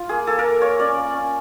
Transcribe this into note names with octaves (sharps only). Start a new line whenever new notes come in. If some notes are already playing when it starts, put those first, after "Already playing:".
Already playing: F4
A#3 G#4
A#3 A4
A#4
A#3
A#3 C#5
C#4 D5
A#3
C#4